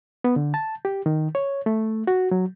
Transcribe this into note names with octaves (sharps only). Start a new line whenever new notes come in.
B3
D3
A5
G4
D#3
C#5
A3
F#4
F#3